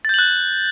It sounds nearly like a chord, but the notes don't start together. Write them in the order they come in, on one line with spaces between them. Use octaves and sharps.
A6 G6 F#7 F#6